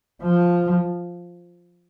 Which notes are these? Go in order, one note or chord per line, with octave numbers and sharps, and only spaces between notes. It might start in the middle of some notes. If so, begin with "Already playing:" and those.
F3